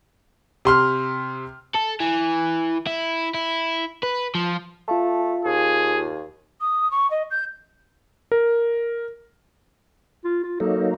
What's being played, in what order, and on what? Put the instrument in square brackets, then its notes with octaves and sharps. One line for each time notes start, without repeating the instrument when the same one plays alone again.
[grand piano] C3 C6 F6
[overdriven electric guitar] A4
E3
E4
E4
B4
F3
[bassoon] A3 [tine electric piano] F4 F5 A5
[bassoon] D#2 [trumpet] G#4
[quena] D#6
C#6
D#5
G6
[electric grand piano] A#4
[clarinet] F4
F4
[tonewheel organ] F#3 A#3 D#4 [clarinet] A4